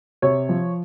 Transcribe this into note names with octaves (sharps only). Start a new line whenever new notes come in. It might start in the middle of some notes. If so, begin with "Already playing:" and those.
C3 C#5
F3